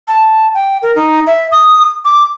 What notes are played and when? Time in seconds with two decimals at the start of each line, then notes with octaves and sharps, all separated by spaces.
0.08 A5
0.54 G5
0.82 A#4
0.95 D#4
1.27 E5
1.52 D#6
2.05 D6